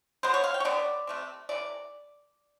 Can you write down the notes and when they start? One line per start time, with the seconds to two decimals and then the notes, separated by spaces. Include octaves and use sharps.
0.23 D3 F#3 B3 C5
0.34 C#5
0.44 F5
0.54 G5
0.60 C#5
0.65 D3 F#3 B3 D5
1.07 C3 E3 A3 C4
1.49 C3 E3 A3 D5